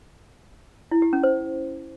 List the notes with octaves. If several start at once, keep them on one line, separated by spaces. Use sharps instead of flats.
E4
G4
C#4
C5